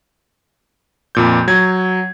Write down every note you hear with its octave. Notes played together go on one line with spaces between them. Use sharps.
F2 A#2 G6
F#3 G#6